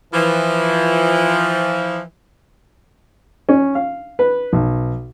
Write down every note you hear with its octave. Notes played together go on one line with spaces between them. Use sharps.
E3 F3
C#4
F5
B4
B1